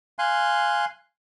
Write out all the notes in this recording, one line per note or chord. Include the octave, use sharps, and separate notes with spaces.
F5 G#5 C6 F#6